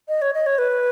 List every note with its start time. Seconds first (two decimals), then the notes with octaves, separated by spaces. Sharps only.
0.09 D#5
0.22 C#5
0.34 D#5
0.46 C#5
0.58 B4